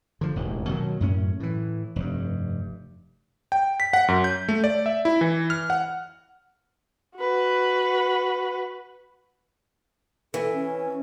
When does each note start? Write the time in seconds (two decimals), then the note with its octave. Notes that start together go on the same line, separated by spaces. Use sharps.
0.21 D3 F3
0.36 E1 A1 D#2
0.69 B2 D#3 F#3
1.00 F#2 A2 C#4
1.40 A2 E3
1.96 F1 G2
3.52 G5
3.80 B6
3.93 F#5
4.08 F#2
4.24 G6
4.48 A3
4.64 D5
4.86 E5
5.05 E4
5.21 E3
5.50 F6
5.70 F#5
7.19 F#4 B4
10.34 E3 A4
10.53 C#4